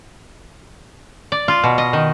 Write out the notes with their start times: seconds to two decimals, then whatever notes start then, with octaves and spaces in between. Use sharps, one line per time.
1.32 D5
1.48 F4
1.64 B2
1.78 D#5
1.93 D#3